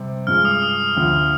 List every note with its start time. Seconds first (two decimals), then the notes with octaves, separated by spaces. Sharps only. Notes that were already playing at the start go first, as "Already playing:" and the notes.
Already playing: C3 G3 C4
0.27 G2 F3 G#3 F6
0.45 D#6
0.62 D#6
0.97 D2 D3 F3